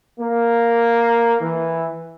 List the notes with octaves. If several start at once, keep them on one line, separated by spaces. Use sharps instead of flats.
A#3
E3